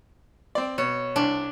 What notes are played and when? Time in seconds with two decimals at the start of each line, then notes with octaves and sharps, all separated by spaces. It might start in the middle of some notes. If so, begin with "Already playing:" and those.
0.55 C4 D5
0.78 B2 C#5
1.16 C2 D4